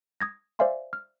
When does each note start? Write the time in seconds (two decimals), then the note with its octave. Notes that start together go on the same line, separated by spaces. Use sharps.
0.20 D#6 G#6 A#6
0.59 C5 D5 E5 F5 G#5 C6
0.93 F6